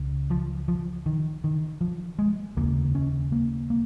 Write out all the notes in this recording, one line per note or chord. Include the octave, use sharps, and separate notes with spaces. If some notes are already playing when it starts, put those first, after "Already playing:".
Already playing: C#2 C#3
F3
F3
D#3
D#3
F3
G#3
F1 D#2 C#3 A#3
C#4
A#3
A#3